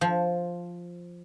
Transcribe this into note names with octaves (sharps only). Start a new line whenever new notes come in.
F3